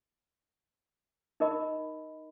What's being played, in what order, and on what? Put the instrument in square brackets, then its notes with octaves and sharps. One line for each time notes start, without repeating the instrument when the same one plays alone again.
[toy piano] D#4 A#4 D#5 B5